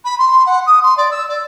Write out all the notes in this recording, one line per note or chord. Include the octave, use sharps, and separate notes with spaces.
B5
C6
F#5
D#6
C6
D5
E6
D5